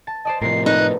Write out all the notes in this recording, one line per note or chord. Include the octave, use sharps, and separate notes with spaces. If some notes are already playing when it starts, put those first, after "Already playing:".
A5
C5 D5 D#5 A5
A2 C3 F3 A#4 C7
A3 D#4 B4 F#6